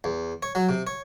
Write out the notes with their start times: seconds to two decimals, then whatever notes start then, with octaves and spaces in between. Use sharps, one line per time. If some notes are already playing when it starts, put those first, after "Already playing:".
0.04 E2
0.43 C#5
0.55 F#3
0.69 C3
0.87 C#5